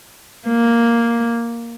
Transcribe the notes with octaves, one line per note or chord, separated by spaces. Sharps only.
A#3